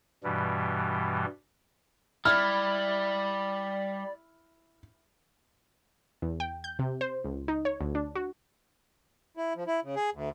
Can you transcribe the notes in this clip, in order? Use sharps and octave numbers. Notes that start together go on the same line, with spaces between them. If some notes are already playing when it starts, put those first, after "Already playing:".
G2 B2 E3 G3
G3 E4 D5 F6
E2
G5
G6
C3
C5
C#2
D#4
C#5
D2
D4
F#4
E4
F3
E4
C#3
G#4
D2